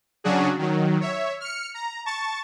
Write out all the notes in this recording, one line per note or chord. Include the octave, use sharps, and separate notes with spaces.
C#3 F#3 C#4 D4 F#4 G#4
D#3 F#3
C#5 E5
F6 C#7
A#5
A5 C#6 A6